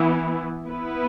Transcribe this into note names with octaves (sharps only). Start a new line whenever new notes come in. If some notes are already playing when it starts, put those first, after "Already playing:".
Already playing: E3 B3 E4
B3 E4 B4